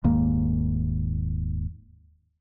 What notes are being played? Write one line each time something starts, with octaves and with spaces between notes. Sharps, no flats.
D#1 D#2 G#2 A#3